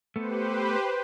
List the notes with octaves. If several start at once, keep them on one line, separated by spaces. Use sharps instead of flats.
A3 B3 G4 B4 C5